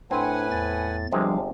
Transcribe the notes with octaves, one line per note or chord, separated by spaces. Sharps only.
A2 C4 D4 B4 F#5 G#5
E2 A6
G1 C3 F3 G3 G#3 D4 F5